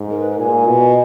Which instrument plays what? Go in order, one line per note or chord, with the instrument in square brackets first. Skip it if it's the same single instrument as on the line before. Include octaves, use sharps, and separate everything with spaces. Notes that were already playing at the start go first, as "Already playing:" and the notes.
Already playing: [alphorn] G#2
[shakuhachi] A#4
B4
A#4
[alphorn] A#2 [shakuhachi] G#5
[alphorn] B2